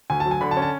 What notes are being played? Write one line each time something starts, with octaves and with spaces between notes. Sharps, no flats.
D2 G#5
A5
F#3
G#5
D3 B5
A5
C#4
A5